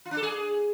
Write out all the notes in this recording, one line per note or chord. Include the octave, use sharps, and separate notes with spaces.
F4
D4
A4
G#4